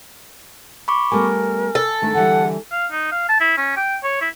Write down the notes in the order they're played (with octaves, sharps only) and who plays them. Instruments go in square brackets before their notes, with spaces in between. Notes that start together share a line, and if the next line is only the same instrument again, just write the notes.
[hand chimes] B5 C#6 D6
[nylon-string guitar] G3 A3 B3 [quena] A#4 [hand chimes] G#5
[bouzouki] A4
[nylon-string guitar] D#3 A3 D4
[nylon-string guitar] D3 E3 G3 [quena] F#5
[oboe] F5
D#4
F5
A5
E4
C#4
G5
C#5
E4